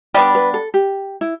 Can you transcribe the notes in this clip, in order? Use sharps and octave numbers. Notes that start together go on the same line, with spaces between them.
G3 B3 D4 D5
B4
A4
G4
E4